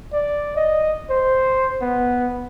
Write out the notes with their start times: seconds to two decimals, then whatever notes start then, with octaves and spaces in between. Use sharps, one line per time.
0.13 D5
0.56 D#5
1.10 C5
1.82 B3